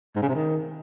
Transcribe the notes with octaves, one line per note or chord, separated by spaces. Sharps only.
G#2
C#3
C3
D#3